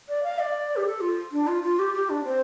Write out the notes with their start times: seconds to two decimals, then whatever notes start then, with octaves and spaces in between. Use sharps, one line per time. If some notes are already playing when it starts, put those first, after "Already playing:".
0.09 D5
0.23 F5
0.39 D5
0.76 G4
0.86 A4
1.01 F4
1.32 D4
1.47 F4
1.63 F4
1.79 G4
1.94 G4
2.10 D4
2.24 C4